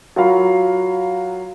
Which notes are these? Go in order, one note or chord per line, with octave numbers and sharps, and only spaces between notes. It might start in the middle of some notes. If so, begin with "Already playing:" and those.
F#3 F4 F#4 A#4 F5 B5